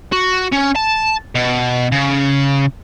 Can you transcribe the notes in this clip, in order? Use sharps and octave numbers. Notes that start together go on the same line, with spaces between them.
F#4
C#4
A5
B2
C#3